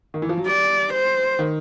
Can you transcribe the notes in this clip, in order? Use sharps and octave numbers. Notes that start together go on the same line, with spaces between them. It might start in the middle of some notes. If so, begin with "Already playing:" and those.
D#3
E3
F3
F#3
G3 D5
C5
D#3